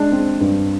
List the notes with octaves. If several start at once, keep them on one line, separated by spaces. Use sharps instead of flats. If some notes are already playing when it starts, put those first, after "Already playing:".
Already playing: G#3 D4
C4
G2